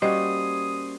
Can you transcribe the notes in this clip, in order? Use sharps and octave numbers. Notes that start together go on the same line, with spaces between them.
G3 A#3 C#4 F#4 C5 D#5 D#6